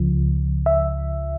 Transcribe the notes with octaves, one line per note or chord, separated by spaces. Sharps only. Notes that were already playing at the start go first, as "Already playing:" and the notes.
Already playing: C#2 C#3 F3
E5